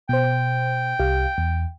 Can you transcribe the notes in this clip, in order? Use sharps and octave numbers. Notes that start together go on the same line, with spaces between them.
B2 C5 G5
C2 G4 F5
E2